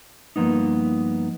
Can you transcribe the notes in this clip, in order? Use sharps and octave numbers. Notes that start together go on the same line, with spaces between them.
G2 F3 A#3 B3 D#4